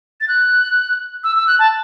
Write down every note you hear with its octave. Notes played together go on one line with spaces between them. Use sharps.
A6
F#6
E6
E6
F#6
A5